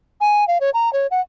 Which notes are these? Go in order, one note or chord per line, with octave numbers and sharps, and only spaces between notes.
G#5
F5
C#5
A#5
C#5
F#5